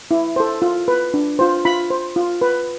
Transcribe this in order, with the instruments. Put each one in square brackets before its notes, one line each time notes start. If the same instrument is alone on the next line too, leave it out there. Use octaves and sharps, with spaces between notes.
[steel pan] E4
A4 C5
F4
B4
D4
F4 C5
F4 B5
C5
F4
B4